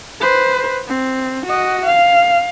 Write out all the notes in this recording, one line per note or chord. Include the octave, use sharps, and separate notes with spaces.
B4 C5
C4
F#4 D#5
F5